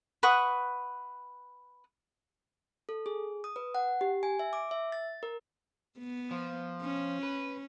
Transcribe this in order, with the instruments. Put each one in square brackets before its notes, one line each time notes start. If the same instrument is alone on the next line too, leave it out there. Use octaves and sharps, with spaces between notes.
[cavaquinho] B4 F#5 C#6 D#6
[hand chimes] A4
G#4
D#6
B4
F#5
G4
G#5
E5
D6
E5
A6
A#4
[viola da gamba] B3
[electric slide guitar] F3
[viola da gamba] C#4
[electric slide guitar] B4